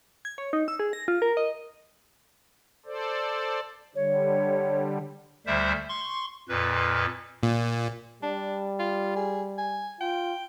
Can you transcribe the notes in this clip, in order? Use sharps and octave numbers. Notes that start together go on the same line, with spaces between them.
G#6
C#5
D#4
E6
G#4
A#6
F4
A#4
D#5
A4 C5 D5
D3 G3 C#5
D2 D3 G3 C5 E5
C6 C#6
F2 A#2 B4
A#2
G3 D4
F4
G#4
G#5
F4 G5